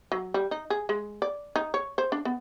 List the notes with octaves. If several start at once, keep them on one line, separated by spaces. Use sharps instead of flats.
F#3
G3
D#4
G#4
G#3
D5
D#4
C#5
C5
D4
B3